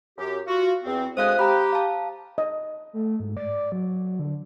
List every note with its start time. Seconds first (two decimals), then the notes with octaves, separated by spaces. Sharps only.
0.17 F#2 G4
0.47 F4 F#4
0.84 E2 C4
1.17 D2 G#3 C5 F5 D#6 F#6
1.39 G4 A#5 B5
1.72 F5 A5
2.38 D#5
2.93 A3
3.20 G#2
3.37 D5
3.72 F#3
4.19 D3